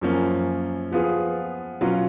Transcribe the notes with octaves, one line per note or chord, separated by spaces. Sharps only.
F#2 F3 A#3 C#4
F3 B3 F4 G#4
B2 F#3 C#4 F4